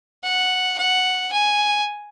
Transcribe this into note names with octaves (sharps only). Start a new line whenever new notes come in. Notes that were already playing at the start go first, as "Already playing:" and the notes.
F#5
F#5
G#5